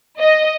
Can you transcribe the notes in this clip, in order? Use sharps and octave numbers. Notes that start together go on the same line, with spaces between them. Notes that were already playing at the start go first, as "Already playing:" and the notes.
D#5